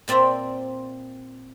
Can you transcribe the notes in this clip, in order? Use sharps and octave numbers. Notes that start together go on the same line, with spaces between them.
A#2 C4 D5 E5 A#5